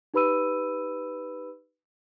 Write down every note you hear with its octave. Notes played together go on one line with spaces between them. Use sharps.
D#4 G4 B4 B5 E6 D#7